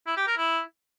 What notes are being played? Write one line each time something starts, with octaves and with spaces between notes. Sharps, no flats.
E4
G4
A#4
E4